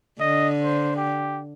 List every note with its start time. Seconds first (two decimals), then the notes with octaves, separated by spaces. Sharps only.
0.20 D3 D#5
0.62 C5
0.96 G4